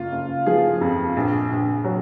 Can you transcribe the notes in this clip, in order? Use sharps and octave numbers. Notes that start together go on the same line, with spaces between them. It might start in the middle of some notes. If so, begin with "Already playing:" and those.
Already playing: F#1 F4
F#1
F3 G#4
F2
A#1
A#1
F#3